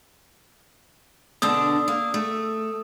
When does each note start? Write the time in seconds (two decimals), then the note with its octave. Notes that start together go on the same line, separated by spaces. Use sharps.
1.42 B2 D3 D4 D#6 E6
1.88 A#3
2.14 A3